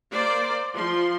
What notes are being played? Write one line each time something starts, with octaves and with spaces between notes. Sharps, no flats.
A#3 C5 D5
F3 C6